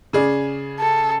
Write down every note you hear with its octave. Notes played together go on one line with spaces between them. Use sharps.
C#3 G#4 D5
A4